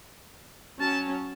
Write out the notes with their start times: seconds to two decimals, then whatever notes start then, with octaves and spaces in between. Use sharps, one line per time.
0.80 F#3 C#4 A5